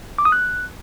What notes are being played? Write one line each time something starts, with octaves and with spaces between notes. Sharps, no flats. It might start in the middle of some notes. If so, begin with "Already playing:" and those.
D6
D#6
F#6